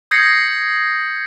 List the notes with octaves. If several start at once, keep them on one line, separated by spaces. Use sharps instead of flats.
D#6 G6 G#6 A#6 C7 C#7